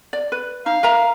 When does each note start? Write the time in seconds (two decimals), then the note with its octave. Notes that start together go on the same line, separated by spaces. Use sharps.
0.13 D5
0.32 B4
0.66 D#4 F5
0.83 A#4 E5 A#5